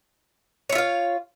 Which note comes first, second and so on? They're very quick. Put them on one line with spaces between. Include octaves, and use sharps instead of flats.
C#5 E5 F4 F5